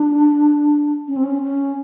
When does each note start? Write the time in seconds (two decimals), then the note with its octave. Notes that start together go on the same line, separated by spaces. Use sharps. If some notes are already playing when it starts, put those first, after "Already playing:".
Already playing: D4
1.08 C#4
1.16 C4
1.24 C#4
1.42 C#4